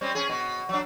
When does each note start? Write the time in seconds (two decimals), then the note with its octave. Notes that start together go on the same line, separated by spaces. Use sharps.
0.01 G3 C4 C#4
0.15 C#4 G#4
0.29 B2
0.69 F#3 D4